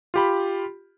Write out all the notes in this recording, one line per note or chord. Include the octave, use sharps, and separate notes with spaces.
F4 G4 B5